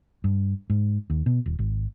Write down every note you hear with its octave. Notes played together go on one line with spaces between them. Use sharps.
G2
G#2
D#2
B2
D#1
G#1